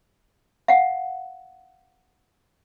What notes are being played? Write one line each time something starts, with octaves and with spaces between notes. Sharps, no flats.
F5 F#5